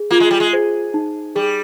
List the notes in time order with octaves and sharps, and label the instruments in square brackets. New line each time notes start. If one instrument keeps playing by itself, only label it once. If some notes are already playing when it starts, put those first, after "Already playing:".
Already playing: [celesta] G#4
[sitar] A#3 [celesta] F4
[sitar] G#3
G3
G#3
[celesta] C5
D#4
[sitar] G3 [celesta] G#4